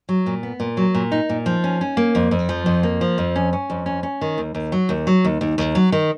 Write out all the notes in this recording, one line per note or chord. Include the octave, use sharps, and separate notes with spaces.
F#3
A#2
B3
A#2
F#3
A#2
D#4
A#2
F3
C#4
C#4
A#3
F2
F2
F3
F2
A#3
F3
F2
C#4
C#4
F2
C#4
C#4
D#3
D#2
D#2
F#3
D#2
F#3
D#2
D#2
D#2
F#3
D#3